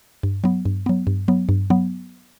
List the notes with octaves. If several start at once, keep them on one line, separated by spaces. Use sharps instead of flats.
G2
F#3 B3
G2
F#3 B3
G2
F#3 B3
G2
F#3 B3